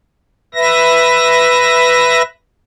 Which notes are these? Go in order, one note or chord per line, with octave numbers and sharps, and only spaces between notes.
B4 E5 A#6